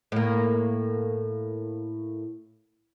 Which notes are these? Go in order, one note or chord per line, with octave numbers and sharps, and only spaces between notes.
A2 A#3